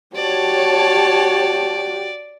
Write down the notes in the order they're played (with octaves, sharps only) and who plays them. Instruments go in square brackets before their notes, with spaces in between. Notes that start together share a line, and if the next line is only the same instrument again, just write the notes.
[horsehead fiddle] F#4 G4 [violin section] C#5 A5 [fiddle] D5